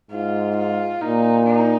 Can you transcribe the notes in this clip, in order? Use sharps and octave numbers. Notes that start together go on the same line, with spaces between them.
G#2 F4
F4
A#2 D#4
D#4